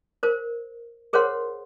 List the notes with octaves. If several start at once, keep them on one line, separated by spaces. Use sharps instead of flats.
A#4 C5
G#4 A#4 C5 C#5 F#5 C6